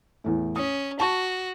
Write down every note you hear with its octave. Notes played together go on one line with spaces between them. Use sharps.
E2 A2
C#4 D#6
F#4 A5 C#6